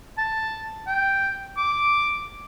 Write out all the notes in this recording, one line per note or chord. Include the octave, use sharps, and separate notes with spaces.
A5
G5
D6